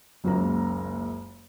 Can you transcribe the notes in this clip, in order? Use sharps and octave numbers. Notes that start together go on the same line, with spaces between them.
F#1 C#2 F#2 A#3 C#4 A#5